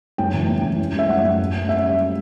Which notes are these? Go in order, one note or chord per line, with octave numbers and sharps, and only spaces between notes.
F#2 G5
E3
F#2
E3
C#4
G3 E5
F#2 F#5
F#2
A2
C#4
C#4 E5
G3